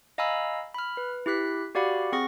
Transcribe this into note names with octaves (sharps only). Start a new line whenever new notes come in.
D#5 F5 G#5 A#5 B5 E6
B5 F6
B4
E4 G4 F#6 B6
F#4 G4 D5 F5 F#5 B5
C4 G#4 F#5 C#6 A#6